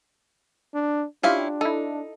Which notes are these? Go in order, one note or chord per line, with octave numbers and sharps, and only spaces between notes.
D4
C#4 D4 E4 F4 G4 F5
D#4 E4 A4